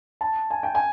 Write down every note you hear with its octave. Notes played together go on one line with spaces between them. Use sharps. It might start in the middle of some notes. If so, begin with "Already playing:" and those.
A5
G#5
G5
G#5